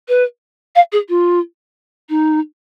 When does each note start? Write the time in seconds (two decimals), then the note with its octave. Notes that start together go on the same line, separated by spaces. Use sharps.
0.08 B4
0.75 F5
0.92 G#4
1.09 F4
2.09 D#4